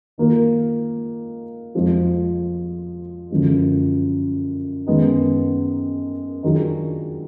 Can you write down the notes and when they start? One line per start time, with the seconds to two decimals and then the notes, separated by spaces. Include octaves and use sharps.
0.18 D#3 A#3 F4 A#4
1.75 F2 F3 G#3
3.30 F#2 D3 F3 G#3
4.87 F#2 D#3 G#3 B3 D#4
6.43 D#3 F#3 D4 F4 G#4